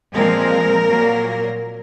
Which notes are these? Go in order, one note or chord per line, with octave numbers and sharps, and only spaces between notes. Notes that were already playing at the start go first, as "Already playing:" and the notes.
A#2 F3 G#3 C4 A#4
A#2 F#3 A#3